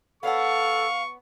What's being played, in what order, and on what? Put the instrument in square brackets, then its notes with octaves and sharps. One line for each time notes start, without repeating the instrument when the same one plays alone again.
[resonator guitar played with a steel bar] B3 C#5 F#5 [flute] A4 [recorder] F5 [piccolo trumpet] C#6